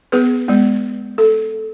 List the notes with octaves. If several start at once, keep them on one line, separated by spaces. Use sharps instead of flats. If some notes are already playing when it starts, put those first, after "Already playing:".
B3 G#4 B4
G#3 B3
A4